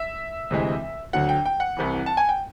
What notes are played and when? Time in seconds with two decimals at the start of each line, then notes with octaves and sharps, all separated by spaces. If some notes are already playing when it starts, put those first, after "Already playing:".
Already playing: E5
0.50 D2 C3 E3 G#3
1.13 D2 D3 F#3 F#5
1.29 G5
1.45 G5
1.60 F#5
1.77 C2 C3 E3
2.06 A5
2.17 G#5
2.29 G5